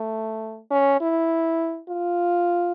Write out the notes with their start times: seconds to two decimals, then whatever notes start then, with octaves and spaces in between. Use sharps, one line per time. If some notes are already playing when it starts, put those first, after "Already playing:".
Already playing: A3
0.71 C#4
1.01 E4
1.88 F4